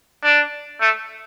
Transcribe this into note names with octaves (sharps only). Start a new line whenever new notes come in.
D4
A3